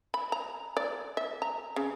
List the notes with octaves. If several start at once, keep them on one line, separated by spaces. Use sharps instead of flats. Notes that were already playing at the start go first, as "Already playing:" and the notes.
B5
A#5
D5
E5
A#5
C#3